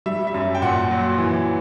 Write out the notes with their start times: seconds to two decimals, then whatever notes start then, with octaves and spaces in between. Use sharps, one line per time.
0.06 G3 E5
0.27 E5
0.34 F#2
0.55 G5
0.62 A#2 F#5
0.91 F#3
1.18 E3